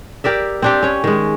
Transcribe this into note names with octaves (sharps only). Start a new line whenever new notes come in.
G4 A#4 D5 E5
C4 D4 G4
C#4 C#5
D#3 G#3